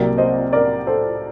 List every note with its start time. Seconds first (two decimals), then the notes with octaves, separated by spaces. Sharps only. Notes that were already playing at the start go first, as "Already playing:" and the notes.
Already playing: C2 C3 F#3 A#3 A#4 D5
0.18 C5 D#5
0.53 A#4 D5
0.87 A4 C5